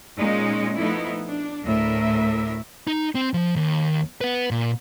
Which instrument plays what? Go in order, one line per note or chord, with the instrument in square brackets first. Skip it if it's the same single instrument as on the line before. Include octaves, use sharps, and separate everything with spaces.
[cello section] A#2 G#3 C#4 D#4
F3 A3 B3 D#4 E4
D4
D2 A2 A#4 E5
[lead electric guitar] D#4
C4
F3
D#2
B4 F#5
A#2